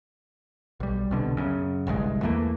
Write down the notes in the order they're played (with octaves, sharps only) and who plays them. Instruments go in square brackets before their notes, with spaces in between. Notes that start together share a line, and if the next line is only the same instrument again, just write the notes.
[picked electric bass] B1 G3
C2 B2 D3
F#2 C#3
G1 C2 G2 G#3
E2 E3 A3 A#3